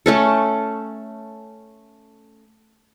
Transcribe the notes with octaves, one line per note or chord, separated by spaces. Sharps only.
A3 C#4 A4